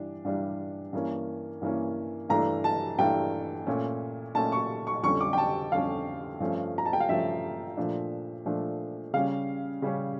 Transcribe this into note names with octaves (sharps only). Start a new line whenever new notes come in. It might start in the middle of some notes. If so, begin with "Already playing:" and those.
Already playing: G2 E3 G3 D4
G2 E3 G3 D4
G2 E3 A#3 C#4
G2 E3 A#3 C#4
G2 E3 A3 D4 A#5
A5
G2 E3 A3 D4 G5
A#2 A3 C#4
A#2 A3 C#4 A5
C#6
C#6
F2 D3 G3 C#4 C#6
D6
G5
A5
F2 D3 G3 C#4 F5
G2 F3 A3 C#4
A#5
A5
G5
F5
G2 F3 A3 C#4 E5
A#2 F3 A3 D4
A#2 F3 A3 D4
C#3 G3 C#4 F5
C#3 G3 C#4